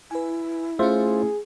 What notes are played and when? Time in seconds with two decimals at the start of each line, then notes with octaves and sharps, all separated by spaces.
0.11 E4 B4 G#5
0.79 A3 C#4 F4 G#4 C5 E5